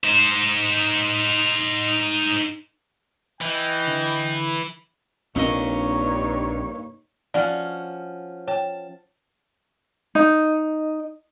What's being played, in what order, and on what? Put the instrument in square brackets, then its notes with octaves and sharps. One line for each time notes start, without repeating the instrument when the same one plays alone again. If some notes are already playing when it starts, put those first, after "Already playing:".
[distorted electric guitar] D#4 C5
[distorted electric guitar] E3 [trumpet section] D#5 G5
[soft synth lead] D3
[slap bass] A#1 C4 D4 [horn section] G2 D#4 C#5 [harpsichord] A#2 D#5
[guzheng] F3 C#4 F#4 [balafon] D5
[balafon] C#5 G5 [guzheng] A5
[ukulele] D#4